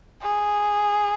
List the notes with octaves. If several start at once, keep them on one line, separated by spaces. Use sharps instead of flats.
G#4